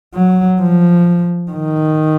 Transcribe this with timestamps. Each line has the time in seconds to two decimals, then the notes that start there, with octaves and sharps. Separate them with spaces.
0.15 F#3
0.60 F3
1.51 D#3